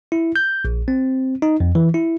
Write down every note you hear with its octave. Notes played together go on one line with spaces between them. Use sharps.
E4
G6
A#1
C4
D#4
F2
E3
E4